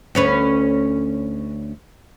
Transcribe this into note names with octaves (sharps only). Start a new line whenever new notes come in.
D2 C#4 B4